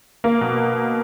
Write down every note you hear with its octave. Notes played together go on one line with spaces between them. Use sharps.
A#3
B2